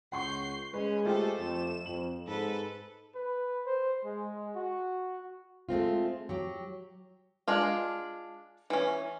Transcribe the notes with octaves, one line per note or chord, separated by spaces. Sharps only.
C#2 F#5 C6 C#6 G6 C7
G#3 C#4 B4
A3 F4 G4 A4 C5
F2 E7
F2 F#7
G#2 A4 B4
B4
C5
G#3
F#4
G#3 A3 C4 F4
F#3 G4
G#3 D4 F4
E3 C#4